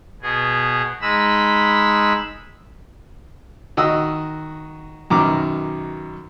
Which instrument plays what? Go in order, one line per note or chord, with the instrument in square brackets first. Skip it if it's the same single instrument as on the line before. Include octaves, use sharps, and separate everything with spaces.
[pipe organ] B2 B3 G#4
G#3 D#4 B5 E6
[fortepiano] D#3 F#4 D#5 D#6 E6
F#2 B2 D#3 A#5 D6